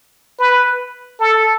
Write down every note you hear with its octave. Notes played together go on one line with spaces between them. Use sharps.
B4
A4